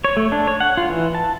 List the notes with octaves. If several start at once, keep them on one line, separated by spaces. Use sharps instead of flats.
C#5
A3
D4
C#5
F#5
F4
E3
A5